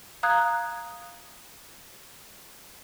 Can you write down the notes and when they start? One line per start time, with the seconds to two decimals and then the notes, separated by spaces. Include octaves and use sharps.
0.23 F5 A#5 D#6 F#6 G#6